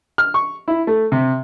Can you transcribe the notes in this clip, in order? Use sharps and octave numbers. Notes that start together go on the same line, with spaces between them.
F6
C#6
E4
A3
C3